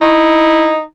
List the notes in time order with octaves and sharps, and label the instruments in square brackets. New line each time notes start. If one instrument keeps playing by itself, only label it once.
[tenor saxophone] D#4 [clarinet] E4